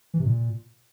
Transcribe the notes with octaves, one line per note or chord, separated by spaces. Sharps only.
E3
C3
A#2